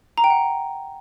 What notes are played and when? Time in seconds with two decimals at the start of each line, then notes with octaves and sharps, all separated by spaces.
0.18 A#5
0.24 G5
0.30 F#5